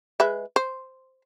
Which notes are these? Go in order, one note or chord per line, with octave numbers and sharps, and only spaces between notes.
G#3 B4 E5
C5